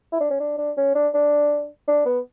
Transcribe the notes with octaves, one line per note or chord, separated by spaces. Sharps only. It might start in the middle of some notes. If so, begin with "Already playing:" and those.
E4
D4
C#4
D4
D4
C#4
D4
D4
D4
B3